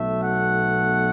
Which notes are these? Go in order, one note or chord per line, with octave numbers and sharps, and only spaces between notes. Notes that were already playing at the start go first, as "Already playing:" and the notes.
Already playing: B1 B2 F#3 A3 E5
F#5